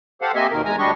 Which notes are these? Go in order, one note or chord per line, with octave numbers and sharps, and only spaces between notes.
G4 A4 C5 F5 F#5
A#3 C4 G4 D#5 E5 G#5
D#2 B2 D#3 A#4
E2 G#3 G#5 A#5
D2 G3 D4 G4 D#5 C#6